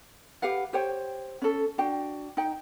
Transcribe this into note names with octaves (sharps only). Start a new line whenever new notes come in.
G4 B4 F5 F#5
G4 C5 C#5 G5
C#4 A4
D4 F#4 G5
D#4 G5